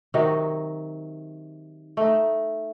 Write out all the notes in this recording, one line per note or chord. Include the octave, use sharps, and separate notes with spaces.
C3 D#3 F#3 D#4
A3 D#4